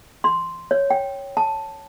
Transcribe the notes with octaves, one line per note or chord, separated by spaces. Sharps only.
C6
C#5
G5
A5